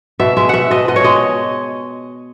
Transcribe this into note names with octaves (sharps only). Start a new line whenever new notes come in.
B2 E5
G#3 E5
B2 E5 F#5
B2 D#5
B2 D#5
C#5
G#3 D#5